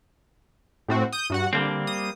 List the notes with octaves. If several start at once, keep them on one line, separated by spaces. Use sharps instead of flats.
A2 C4 F#4
D#6 G6
G2 F#4 F#5
D3 G3 A#3 C4
D#6